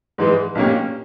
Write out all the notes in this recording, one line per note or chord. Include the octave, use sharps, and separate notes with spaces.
G#2 E3 G#3
B1 A#2 A#3 C#4 G4